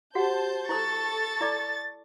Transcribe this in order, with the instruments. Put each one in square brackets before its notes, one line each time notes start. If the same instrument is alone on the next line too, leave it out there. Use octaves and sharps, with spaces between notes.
[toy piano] F#4 G4 F#5 [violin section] C5 A5 G6
[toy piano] E4 C5 D#6 [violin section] A4 C#6 [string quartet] A6
[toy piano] E4 D5 D6